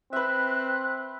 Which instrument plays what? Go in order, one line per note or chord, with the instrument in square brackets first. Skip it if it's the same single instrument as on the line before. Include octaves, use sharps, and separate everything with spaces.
[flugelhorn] C4 [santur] B4 E5 [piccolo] F#6